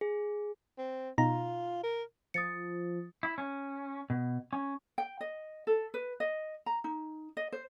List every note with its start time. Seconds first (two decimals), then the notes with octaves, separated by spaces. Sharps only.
0.01 G#4
0.78 C4
1.18 B2 D#4 F4 A#5
1.83 A#4
2.34 F3 D#6 A6 C#7
3.23 E4
3.38 C#4
4.10 B2
4.53 C#4
4.98 G5
5.21 D#5
5.67 A4
5.94 B4
6.20 D#5
6.66 A#5
6.84 D#4
7.37 D#5
7.52 C5